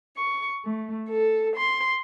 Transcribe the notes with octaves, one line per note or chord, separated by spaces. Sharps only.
C#6
A3
A4
C6